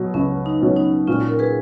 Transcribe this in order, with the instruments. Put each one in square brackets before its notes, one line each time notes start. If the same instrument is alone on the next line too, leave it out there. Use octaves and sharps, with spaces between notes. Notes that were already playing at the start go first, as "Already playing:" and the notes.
Already playing: [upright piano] B2 F#3
[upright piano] C#2 [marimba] C#4
[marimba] D#4
[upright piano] B2 F#3 C#4
[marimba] D#4
[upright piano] A#2 [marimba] C#4 F4
[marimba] A#4
G#4 B4